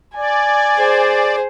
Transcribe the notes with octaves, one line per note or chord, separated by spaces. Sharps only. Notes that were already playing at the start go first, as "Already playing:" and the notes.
D5 G#5
G#4 C5